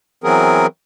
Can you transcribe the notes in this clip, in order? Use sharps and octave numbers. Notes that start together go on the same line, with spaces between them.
E3 F#3 B3 C4 G#4 A#4